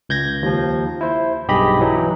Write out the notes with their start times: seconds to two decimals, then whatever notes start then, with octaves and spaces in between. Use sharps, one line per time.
0.09 C#2 G6 G#6 A#6
0.43 D#2 F3
1.01 E4 C5
1.48 B1 G2 G4 G#4 D#5 B5
1.80 E3 F#3 D#4